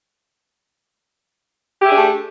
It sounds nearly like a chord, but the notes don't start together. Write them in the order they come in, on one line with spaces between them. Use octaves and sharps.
G4 E4 G#4 D4 A3